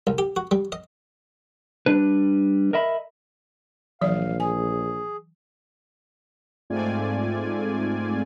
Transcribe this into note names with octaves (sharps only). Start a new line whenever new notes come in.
C2
G4
F#4
G3
D#5
G3 D4 B4
A#4 D#5 E5 B5
A#1 E3 F#3 D5 F5
G#4 G#5
G#2 A3 C4 F4 D5 G#5